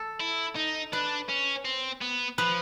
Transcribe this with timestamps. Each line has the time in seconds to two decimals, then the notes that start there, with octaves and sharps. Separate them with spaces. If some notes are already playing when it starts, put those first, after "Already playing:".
Already playing: A4
0.20 E4
0.56 D#4
0.93 D4 B4
1.29 C#4
1.65 C4
2.01 B3
2.38 F3 B4